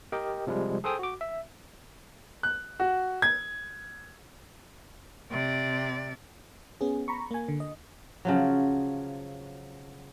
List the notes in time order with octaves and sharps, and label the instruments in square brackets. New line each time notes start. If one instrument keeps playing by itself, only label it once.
[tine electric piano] G4 A#4 D#5 G5
C3 F3 G3 G#3
G#4 A4 C5 G5 D#6
F#4 D6
E5
[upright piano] F#6
F#4
G#6
[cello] C3 D5
[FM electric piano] B3 C#4 G#4
A#5 B5 C#6
A#3 G#5
D3
D#5
[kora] C#3 F3 F#3